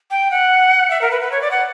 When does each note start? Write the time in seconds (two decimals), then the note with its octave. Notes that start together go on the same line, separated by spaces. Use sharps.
0.11 G5
0.31 F#5
0.90 E5
1.01 A#4
1.11 B4
1.21 B4
1.32 C#5
1.41 D5
1.51 F#5